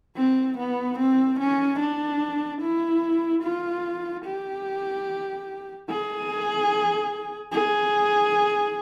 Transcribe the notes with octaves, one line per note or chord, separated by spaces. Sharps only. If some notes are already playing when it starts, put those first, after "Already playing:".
C4
B3
C4
C#4
D4
E4
F4
G4
G#4
G#4